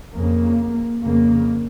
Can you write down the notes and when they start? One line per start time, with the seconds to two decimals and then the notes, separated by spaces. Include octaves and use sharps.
0.14 F2 C#3 A#3
1.03 F2 C#3 A#3